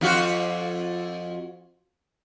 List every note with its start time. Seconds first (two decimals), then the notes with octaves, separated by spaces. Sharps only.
0.01 F2 F4 F#4